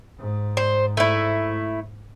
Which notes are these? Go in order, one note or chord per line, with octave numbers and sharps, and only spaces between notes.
G#2
C5
A3 E4